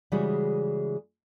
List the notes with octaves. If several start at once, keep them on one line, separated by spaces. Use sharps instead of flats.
C#3 E3 G3 G#3 F#4 G#4